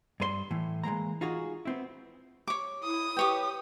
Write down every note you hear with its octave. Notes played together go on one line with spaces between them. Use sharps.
G2 B4 C6
A2 E3
E3 G#3 A#3 A#5
D#4 F4 F#4 G#4
B3 C4 E4
C#5 D6
E4 D#6
G4 B4 C#5 G5